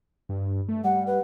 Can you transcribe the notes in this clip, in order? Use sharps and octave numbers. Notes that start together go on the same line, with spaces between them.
G2
A3
G3 F#5
B4